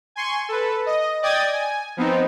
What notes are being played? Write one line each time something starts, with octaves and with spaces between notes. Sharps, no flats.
G#5 C6 C#6
A4 B4
D#5
D5 D#5 G5 D#6 G#6 A6
G#5
F3 B3 C4 D#4